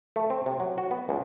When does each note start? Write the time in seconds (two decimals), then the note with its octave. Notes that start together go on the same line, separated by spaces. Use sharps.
0.16 A3
0.30 C4
0.46 C3
0.60 F#3
0.78 F#4
0.91 B3
1.09 C#2